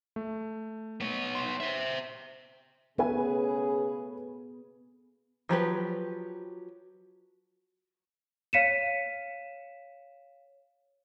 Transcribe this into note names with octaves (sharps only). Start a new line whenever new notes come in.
A3
B3 C#5
C6
C5 E5
C#3 A3 B3 G#4 B4 G#5
F3 F#3 G4 B4
C#5 F5 B6 C#7 D#7 E7